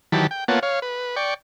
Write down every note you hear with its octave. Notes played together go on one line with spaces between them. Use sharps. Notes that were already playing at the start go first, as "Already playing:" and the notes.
D#3 E3 F#3 G4 A5 B5
G5
A#3 B3 F4 C#5 F#5 A5
C#5 F5
B4
D5 G5 C#6